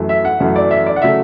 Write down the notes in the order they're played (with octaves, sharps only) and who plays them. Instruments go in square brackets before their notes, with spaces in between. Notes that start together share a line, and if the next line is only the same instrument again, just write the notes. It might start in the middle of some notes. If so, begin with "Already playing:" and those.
Already playing: [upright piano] F#2 E3 A3
E5
F#5
F#2 E3 A3
D5
E5
D5
F#5
C#3 F#3 A3 E5